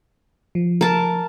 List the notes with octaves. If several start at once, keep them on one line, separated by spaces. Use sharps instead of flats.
F3
A#4 A5